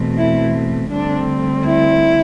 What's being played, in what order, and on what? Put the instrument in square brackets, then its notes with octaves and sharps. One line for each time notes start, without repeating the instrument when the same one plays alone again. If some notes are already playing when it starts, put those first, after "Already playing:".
Already playing: [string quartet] E2 B2 A3 C4
E4
D2 D3 G3 C4 D4
E4